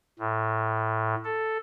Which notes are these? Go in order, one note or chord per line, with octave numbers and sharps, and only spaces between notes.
A2
A4